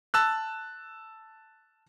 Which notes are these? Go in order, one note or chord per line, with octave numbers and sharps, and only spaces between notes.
A5 E6 F#6